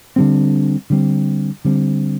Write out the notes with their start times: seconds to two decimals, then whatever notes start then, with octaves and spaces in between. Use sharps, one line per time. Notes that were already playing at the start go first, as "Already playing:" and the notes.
0.16 D3 G3 C4
0.90 D3 G3 C4
1.65 D3 G3 C4